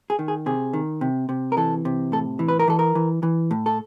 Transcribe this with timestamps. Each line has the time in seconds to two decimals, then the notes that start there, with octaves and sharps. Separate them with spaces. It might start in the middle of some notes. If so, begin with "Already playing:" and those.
0.10 G#4
0.19 D#3
0.28 G#4
0.46 C3 G#4
0.73 D#3
1.01 C3
1.29 C3
1.52 A#4
1.57 E3 A4
1.85 C3
2.12 A2 A4
2.39 E3
2.48 B4
2.59 A#4
2.68 E3 A4
2.79 A#4
2.95 E3
3.23 E3
3.51 A2
3.66 A4